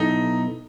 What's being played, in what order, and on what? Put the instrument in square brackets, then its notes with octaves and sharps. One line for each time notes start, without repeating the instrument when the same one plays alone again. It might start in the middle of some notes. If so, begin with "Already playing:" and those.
Already playing: [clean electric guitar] B2 F#3 B3 E4 A4 [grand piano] D#4